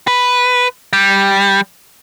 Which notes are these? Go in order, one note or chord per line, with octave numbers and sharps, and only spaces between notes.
B4
G3